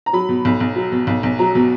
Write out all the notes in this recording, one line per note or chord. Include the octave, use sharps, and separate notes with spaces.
A#5
F#3 B5
B2
B1
B1
F#3
B2
B1
B1
F#3 A#5
B2